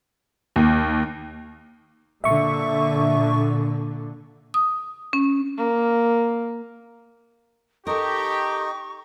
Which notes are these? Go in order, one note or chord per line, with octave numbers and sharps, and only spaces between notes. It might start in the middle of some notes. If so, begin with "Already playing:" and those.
D#2
A#2 D3 E5 C#6
D#6
C#4
A#3
D#4 G4 A4 A#4 D#5 C#6